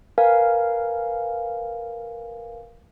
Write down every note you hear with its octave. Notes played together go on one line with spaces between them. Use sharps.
A#4 B4 F5 G#5